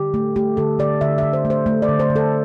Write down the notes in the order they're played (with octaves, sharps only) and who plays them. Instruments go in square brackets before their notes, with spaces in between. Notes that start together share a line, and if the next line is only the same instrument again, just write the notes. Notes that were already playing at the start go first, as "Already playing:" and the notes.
Already playing: [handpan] D3 G4
A3
A3 G4
D3 A4
D3 D5
D3 E5
D3 E5
C5
A3
C5
A3
D5
D3
C5
D3
A4